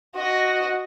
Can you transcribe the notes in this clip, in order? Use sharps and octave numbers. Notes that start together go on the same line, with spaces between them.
F#4 D#5